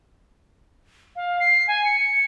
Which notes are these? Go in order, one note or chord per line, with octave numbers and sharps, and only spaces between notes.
F5
C7
G#5
C#7